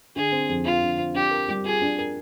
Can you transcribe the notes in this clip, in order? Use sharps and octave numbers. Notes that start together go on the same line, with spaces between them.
D3 G#4
C4
F2
F3 F4
D3
C4
D4 G4
A#4
G3
F4 G#4
D4
A#4